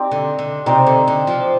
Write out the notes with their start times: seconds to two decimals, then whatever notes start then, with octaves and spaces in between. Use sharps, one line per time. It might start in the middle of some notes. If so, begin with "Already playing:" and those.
Already playing: C4 D#4 G4 D5
0.11 D3
0.39 D3
0.66 C3 C4 D#4 G4 D5
0.87 D3
1.08 D3
1.27 F3